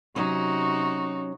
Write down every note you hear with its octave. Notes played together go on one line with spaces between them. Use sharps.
C3 F#3 C#4 D#4 F#4